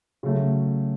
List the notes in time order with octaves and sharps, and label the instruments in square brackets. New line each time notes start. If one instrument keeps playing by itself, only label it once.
[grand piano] C#3 F#3 A3